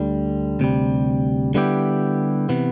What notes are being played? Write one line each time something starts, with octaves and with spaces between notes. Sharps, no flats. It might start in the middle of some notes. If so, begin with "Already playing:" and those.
Already playing: D2 D3 G3
D2 C3 G3
D3 G3 B3 E4 G4
C3 E3 B3